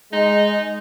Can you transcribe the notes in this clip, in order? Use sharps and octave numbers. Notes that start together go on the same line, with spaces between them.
G#3 D#4